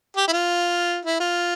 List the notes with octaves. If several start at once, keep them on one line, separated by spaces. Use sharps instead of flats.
G4
E4
F4
E4
F4